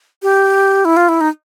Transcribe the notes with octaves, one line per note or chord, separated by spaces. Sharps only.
G4
E4
F4
E4
D#4